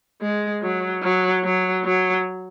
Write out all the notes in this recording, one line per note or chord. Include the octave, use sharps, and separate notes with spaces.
G#3
F#3
F#3
F#3
F#3